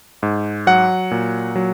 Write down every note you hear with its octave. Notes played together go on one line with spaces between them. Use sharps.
G#2
F#3 F#5
A#2
F#3